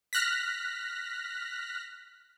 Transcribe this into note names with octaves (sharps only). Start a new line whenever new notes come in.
F6 F#6 A#6 B6